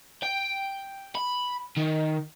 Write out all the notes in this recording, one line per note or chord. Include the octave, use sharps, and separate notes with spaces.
G5
B5
D#3